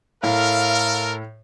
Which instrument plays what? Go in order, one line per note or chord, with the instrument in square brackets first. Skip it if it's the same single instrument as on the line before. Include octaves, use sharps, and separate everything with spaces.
[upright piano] A2 [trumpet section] A4 A#4 [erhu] F5